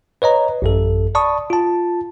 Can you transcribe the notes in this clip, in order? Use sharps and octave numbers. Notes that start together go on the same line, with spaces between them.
B4 C#5 D#5 A#5
A1 F#2 A4
D5 A5 B5 C#6 D#6
F4 A5